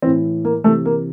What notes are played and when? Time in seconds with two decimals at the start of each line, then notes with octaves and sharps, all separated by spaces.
0.02 A2 E3 C4
0.45 A#3
0.64 C3 E3 A3
0.85 A#3